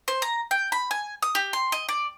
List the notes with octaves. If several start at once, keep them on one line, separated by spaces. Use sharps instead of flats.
C5
A#5
G5
B5
G#5
D#6
G4
C6
D#5
D5